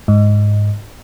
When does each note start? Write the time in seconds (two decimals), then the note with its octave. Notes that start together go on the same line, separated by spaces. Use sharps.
0.08 G#2